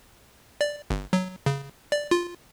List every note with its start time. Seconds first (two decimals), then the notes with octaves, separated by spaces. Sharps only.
0.61 D5
0.90 G1
1.13 F#3
1.46 C#3
1.92 D5
2.11 F4